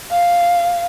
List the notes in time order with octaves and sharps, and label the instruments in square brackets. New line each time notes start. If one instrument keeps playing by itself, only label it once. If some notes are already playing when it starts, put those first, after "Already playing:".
[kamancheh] F5